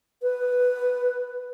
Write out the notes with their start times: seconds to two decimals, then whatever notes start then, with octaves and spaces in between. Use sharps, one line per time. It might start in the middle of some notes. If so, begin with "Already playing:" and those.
0.22 B4